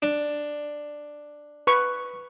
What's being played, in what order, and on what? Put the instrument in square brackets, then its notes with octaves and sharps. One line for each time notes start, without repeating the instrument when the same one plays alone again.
[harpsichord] D4
[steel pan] B4 C#6